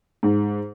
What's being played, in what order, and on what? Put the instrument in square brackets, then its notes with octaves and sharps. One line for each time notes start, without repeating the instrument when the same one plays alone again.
[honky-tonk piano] G#2